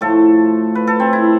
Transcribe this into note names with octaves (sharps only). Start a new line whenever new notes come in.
A2 F3 A3 A4
B4
A4
C4
E4